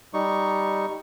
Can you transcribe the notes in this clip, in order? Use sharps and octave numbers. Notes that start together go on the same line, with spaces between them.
G3 D#4 C#6